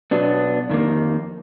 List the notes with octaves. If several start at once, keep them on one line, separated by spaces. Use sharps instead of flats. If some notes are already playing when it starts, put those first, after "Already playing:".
B2 F#3 B3 D4
F2 D#3 A#3